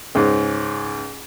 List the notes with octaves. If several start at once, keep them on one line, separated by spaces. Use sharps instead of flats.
C#2 G#2